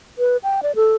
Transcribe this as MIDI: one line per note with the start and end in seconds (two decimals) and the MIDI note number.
0.19 0.37 71
0.43 0.60 79
0.63 0.75 74
0.75 0.95 69